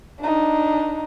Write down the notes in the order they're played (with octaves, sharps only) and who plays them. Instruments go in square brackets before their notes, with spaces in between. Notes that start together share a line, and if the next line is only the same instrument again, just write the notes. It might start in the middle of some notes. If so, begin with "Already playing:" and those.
[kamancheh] D4 D#4